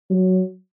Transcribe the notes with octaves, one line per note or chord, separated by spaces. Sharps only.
F#3